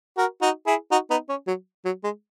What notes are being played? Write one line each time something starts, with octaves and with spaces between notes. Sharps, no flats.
F#4 A#4
D#4 F#4
E4 G#4
D#4 F#4
B3 D#4
C#4
F#3
F#3
G#3